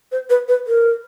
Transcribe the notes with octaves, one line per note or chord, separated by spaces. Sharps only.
C5
B4
B4
A#4